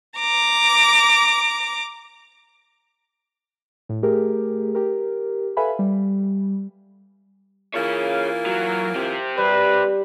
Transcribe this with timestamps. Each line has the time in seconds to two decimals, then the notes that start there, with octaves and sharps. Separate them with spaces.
0.18 A#5 D6
3.89 A2
4.03 A3 G4 G#4 A#4
4.75 G4 A#4
5.57 A4 B4 E5 F5 G#5 B5
5.79 G3
7.74 E3 A#3 F4 G#4 C#5
8.46 F#3
8.96 C4 G4
9.38 G3 B4